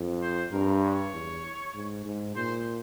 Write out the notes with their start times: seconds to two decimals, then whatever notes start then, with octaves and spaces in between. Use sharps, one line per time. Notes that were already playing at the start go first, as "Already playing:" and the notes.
Already playing: F2
0.22 C5
0.52 G2 A#4
0.83 C#5
1.13 E2
1.74 G#2
2.05 G#2
2.36 A#2 C5